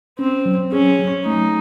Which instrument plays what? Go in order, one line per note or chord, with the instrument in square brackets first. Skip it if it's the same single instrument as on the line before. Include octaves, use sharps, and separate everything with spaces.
[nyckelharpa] C4 [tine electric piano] C#4
[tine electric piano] F#3
[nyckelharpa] C#4 [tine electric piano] G#4
[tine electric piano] F#3
[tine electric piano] A3 [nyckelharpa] D#4